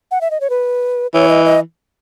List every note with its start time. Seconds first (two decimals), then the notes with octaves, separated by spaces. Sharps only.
0.11 F#5
0.21 E5
0.31 D#5
0.41 C#5
0.50 B4
1.14 E3 C#5
1.29 D#5
1.45 D#5